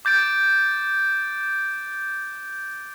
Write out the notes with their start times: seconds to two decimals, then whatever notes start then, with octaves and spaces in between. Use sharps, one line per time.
0.05 D6 G6 A6 D7